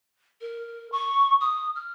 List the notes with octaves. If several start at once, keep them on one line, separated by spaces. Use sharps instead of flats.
A#4
C#6
D#6
F6